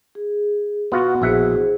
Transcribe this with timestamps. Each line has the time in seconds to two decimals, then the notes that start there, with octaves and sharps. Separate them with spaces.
0.15 G#4
0.92 B2 B3 F4 F#4 F#5
1.22 A#1 E4 G#4 C5 E5 F#5